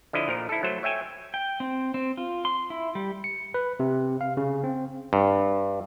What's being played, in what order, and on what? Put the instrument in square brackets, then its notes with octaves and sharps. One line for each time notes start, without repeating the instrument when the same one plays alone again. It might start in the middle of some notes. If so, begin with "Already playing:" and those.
[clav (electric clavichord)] D3 F3 E4 D#5
A#2 F3 A#4
E4 A4
F#3 A3 C5
C#5 E5 G5 G#5
[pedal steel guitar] G5
C4
C4
F4
C6
E4
G3
[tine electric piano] C#7
B4
C3
F5
C#3
C4
[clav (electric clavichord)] G2